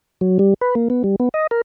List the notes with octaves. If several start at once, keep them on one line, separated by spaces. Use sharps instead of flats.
F#3
G3
B4
A#3
B3
G3
B3
D#5
A#4